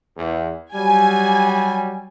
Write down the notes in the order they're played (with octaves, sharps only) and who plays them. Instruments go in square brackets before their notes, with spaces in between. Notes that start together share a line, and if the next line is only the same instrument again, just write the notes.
[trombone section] E2
[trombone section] F#3 G3 [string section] G#5